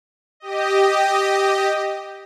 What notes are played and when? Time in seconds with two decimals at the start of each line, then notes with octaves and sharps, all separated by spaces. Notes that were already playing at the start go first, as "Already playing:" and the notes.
0.40 G4 D#5